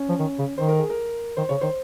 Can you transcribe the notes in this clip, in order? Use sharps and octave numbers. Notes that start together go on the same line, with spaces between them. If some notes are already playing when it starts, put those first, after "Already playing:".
Already playing: C#4
F3
D#3
C#3
D#3 C5
A#4
G#4
A#4
D#3 C5
C#3 C#5
D#3 C5